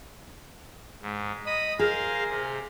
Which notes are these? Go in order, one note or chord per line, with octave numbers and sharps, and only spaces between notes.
G#2
D#5 B5 D#6
G#4 A#4 C5 F5
C3